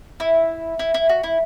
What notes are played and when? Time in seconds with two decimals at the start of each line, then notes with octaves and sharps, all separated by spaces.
0.20 E4
0.79 E4
0.94 E4
1.09 F#4
1.24 E4